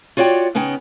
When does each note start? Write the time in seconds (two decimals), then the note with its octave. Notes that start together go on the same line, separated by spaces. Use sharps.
0.17 F4 F#4 C#5 D5 G5
0.55 C#3 B3 C#4 D#4 G5